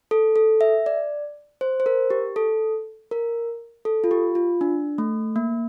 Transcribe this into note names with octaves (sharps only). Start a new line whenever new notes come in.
A4
A4
E5
D5
C5
C5
A#4
G4
A4
A#4
A4
F4
G4
F4
D4
A3
A#3